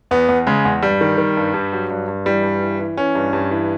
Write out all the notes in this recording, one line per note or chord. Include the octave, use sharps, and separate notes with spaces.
E2 B3
E2
C#3 G#3
E2
G2 G3
D#3
D#3
G2
G2
F#3
G2
G2
E3 G3
G2
E3
E3
E3 C#4
G2
G2
E3